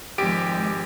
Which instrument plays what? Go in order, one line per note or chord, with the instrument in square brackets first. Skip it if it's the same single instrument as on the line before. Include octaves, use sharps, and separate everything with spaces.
[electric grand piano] G#1 G4 D7 [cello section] F3 G#3